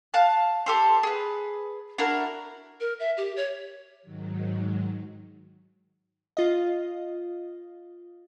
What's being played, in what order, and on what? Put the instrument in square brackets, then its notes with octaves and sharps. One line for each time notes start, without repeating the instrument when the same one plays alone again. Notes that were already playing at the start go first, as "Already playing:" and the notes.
[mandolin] F5 A5 F#6
G4 A4 C5
G#4 B4
D4 E4 F#4 A#4
[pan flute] A#4
E5
G4
C#5
[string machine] G#2 D#3 F#3
[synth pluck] F4 D#5